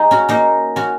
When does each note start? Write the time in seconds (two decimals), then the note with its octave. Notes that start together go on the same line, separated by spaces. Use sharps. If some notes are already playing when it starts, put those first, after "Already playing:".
Already playing: D#4 G#4
0.11 C#4 F#4
0.29 A#3 D#4
0.76 C#4 F#4